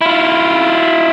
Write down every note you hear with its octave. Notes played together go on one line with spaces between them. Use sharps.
E4 F4